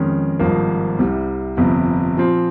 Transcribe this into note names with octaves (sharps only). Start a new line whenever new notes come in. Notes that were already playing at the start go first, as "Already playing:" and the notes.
Already playing: F2 D#3 G#3 C#4
G#1 G2 F3 A#3 D#4
C2 C3 G3
G1 F2 C3
A#2 F3 C4